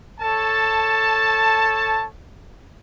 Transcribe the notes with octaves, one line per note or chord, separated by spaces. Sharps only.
A4 C#5 A5